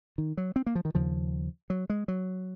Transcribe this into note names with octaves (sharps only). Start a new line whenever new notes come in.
D#3
F#3
C4
A#3
F3
D#3
D#2 C#3 F3
F#3
G#3
F#3